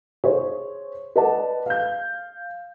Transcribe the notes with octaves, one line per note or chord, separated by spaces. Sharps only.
G#4 C5 C#5
B4 D5 D#5 F#5 A5
F5 G6